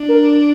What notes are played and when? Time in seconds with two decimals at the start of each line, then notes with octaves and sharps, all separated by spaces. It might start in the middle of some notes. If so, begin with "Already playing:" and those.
Already playing: D4
0.09 A#4